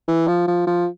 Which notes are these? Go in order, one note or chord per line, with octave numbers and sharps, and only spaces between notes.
E3
F3
F3
F3